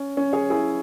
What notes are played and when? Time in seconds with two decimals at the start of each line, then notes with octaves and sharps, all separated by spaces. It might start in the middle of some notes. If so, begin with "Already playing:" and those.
Already playing: C#4
0.17 C#4
0.33 G#4 C#5
0.50 E4 G#4